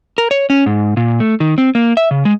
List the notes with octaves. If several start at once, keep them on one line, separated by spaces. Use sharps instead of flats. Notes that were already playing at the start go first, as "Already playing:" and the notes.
A#4
C#5
C#4
G#2
A#2
A3
D#3
C4
A#3
E5
C#3
G#3